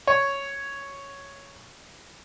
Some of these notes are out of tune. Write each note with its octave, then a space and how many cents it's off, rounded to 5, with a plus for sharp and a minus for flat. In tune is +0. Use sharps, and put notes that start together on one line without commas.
C#5 +0